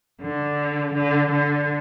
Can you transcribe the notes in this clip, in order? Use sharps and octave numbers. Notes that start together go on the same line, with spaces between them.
D3
D3
D3